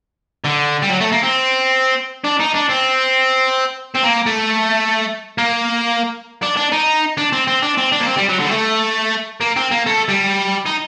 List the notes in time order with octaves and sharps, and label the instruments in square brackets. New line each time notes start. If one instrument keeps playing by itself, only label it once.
[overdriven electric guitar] D3
G3
F#3
A3
A#3
C4
D4
D#4
D4
C4
C4
A#3
A3
A#3
D4
D4
D#4
D4
C4
C4
D4
C4
D4
A#3
C4
G3
F#3
D3
G3
A3
A#3
C4
A#3
A3
G3
D#4